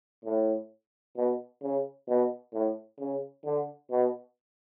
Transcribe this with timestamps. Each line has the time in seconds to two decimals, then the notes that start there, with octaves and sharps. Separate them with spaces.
0.25 A2
1.16 B2
1.62 C#3
2.08 B2
2.53 A2
3.00 C#3
3.45 D3
3.91 B2